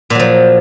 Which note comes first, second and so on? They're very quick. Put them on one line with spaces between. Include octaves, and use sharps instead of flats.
A#2 F#3 F3